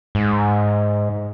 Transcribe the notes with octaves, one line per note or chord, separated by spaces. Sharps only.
G#2